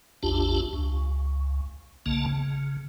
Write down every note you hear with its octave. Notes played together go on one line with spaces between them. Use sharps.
A1 E2 D4 F4 G4 A5
C#2
B1 C#3 A#3 A5
C#3